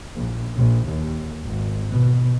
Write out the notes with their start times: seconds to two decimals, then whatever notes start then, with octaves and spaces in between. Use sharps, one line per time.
0.16 A#1
0.55 A#1
0.88 D#2
1.42 G#1
1.91 B2